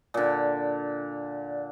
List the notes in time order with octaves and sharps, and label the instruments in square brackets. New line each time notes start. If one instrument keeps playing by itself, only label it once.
[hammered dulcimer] A#2 D3